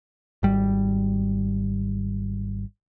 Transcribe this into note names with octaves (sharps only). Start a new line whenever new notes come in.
G#1 G3